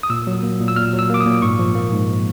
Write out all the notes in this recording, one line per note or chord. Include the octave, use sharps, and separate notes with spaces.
D#6
A#2 E6
F#3
A#3
A#2
E6
A#2 F6
F#3
E6
A#3 D6
D#6
A#2
G#2 C#6
F3
A#3
G#2